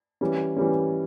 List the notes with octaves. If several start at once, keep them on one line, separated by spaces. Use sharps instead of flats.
E3 G3 C#4
E3 G3 C#4